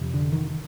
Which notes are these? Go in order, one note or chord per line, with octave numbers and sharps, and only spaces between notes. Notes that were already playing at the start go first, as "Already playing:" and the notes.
Already playing: F2 C3
D3
D#3